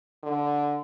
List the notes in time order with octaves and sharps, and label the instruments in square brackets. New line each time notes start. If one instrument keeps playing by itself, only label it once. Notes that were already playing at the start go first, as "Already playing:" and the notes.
[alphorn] D3